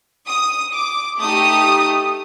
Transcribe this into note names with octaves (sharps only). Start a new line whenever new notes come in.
D#6
D6
A3 D#4 G4 D#6